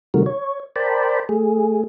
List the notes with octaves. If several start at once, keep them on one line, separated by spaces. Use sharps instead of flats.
C3 D#3 G3 A3 F#4 A#4
C#5
A#4 C5 D5 G5 A5 B5
A3 G#4